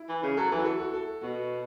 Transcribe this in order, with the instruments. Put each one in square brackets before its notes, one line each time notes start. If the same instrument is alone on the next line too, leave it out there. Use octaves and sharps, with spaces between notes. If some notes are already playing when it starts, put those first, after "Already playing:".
Already playing: [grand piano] E4
[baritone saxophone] E3
C#3
[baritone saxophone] F#3 [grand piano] A4
[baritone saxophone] E3 [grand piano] E4
[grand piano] F#4
A4
F#4
A4
[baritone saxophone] B2 [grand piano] F#4